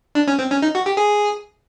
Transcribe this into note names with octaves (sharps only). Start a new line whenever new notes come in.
D4
C#4
C4
C#4
D#4
F#4
G4
G#4